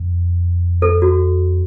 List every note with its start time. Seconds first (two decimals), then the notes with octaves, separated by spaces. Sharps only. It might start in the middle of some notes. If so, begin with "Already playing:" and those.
Already playing: F2
0.82 A4
1.02 F#4